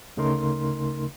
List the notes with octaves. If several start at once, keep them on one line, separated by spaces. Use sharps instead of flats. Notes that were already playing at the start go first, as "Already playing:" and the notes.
D2 C#3 A3 D#4 A#4 C6